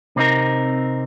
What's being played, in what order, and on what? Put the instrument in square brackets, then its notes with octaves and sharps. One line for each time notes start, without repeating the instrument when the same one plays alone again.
[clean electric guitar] C3 C4 D#4 A#4